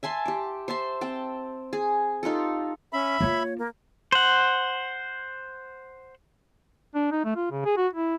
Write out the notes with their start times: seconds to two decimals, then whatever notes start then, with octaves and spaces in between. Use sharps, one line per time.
0.03 E5 G#5 A5 C6
0.26 G4 D6
0.68 C5 E5 A5 C6
1.01 C4 G5 A5
1.73 G#4
2.23 D#4 F4 G4 A4
2.93 C#4 E5 B5
3.21 A#3 F4 C#5
3.58 A#3
4.12 C5 F#5
6.95 D4
7.11 D#4
7.25 A3
7.36 F4
7.51 C#3
7.65 G#4
7.77 F#4
7.93 E4